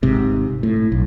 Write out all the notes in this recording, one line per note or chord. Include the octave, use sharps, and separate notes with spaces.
G#1 G#2 C3
A2
B1